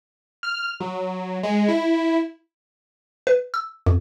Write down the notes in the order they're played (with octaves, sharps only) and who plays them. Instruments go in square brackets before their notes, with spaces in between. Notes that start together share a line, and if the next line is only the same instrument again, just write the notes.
[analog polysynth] F6
F#3
G#3
E4
[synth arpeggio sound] B4
E6
F2